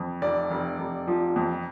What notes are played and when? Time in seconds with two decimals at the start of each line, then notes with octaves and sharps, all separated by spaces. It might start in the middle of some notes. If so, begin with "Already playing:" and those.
Already playing: F2
0.22 F1 D5
0.51 F1
0.79 F1
1.07 F3
1.36 F2